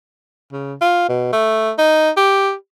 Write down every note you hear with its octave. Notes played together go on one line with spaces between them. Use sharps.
C#3
F4
B2
A3
D#4
G4